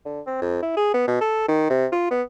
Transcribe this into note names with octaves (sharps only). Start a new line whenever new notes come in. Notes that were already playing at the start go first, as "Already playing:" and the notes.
D3
C4
F2
E4
G#4
B3
B2
A4
D#3
C3
F4
B3